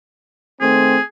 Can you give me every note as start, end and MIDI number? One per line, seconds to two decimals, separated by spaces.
0.61 0.96 51
0.61 0.96 57
0.61 0.96 60
0.61 1.03 68